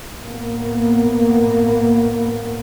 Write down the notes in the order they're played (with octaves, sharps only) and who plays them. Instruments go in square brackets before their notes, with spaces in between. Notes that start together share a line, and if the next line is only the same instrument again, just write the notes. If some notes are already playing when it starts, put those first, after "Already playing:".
[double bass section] A2 A#3 B3